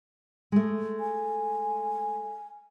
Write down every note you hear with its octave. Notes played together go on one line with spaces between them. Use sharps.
G#3 A3
G#5